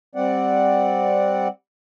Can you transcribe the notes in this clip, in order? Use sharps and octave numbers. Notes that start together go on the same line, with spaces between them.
G3 C4 D5 F#5